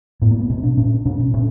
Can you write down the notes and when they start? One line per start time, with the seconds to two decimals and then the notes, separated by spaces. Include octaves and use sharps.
0.22 A2 B3
0.31 A#3
0.40 B3
0.50 B2 C4
0.63 D4
0.77 A#2 C#4
1.05 B2 D4
1.20 C#4
1.33 A#2 C#4